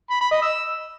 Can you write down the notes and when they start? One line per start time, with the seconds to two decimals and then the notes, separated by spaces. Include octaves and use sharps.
0.10 B5
0.21 B5
0.32 D#5
0.42 E6